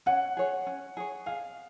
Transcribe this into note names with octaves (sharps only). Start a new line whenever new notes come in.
C#4 F#5
G#4 C#5
C#4
G#4 C#5
G#4 F5